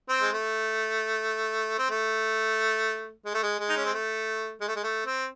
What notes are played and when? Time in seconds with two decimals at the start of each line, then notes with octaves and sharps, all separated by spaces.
0.09 C4
0.21 G#3
0.32 A3
1.79 C4
1.90 A3
3.25 G#3
3.34 A3
3.43 G#3
3.59 G#3
3.69 D#4
3.77 C#4
3.85 C4
3.93 A3
4.61 G#3
4.68 A3
4.76 G#3
4.83 A3
5.06 C4